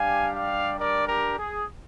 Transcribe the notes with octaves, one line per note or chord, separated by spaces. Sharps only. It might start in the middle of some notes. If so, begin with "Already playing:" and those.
Already playing: G3 D4 G4 F5 G#5
D5 F5
A#4 D5
G4 A#4
G#4